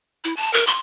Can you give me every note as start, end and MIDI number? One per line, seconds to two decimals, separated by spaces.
0.24 0.36 64
0.37 0.53 81
0.53 0.66 70
0.67 0.80 84